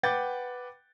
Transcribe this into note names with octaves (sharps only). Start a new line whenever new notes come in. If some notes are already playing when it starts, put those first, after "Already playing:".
B4 F#5 G5 D6 G6 A6